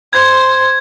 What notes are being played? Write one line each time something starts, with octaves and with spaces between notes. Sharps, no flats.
C5 G#6